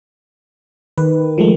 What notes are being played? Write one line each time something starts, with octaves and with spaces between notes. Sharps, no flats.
D#3 B4
F3 G#3 A3